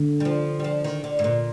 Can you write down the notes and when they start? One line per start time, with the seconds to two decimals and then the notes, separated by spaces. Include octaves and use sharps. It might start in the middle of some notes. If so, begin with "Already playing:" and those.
Already playing: D3
0.20 G3
0.25 F3
0.60 G3
0.64 F3
0.84 D#3
1.04 D3
1.19 G#2
1.24 A#2